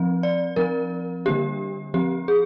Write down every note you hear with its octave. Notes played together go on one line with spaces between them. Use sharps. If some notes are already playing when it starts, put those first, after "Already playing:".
Already playing: F3 C4
D5
F3 C4 A#4
D3 G3 A#3 D4 G4
F3 C4 G4
G#4